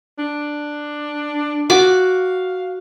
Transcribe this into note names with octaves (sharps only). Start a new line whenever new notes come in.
D4
F#4 F5 D6